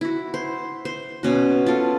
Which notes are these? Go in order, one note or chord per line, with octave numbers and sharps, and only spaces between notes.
E4 F#4
C5
C5
B2 C#4 F#4
F4 A4